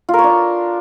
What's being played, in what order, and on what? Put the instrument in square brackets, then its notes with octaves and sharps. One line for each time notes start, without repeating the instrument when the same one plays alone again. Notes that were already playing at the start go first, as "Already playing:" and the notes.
[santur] F4
A#4
C#5
D4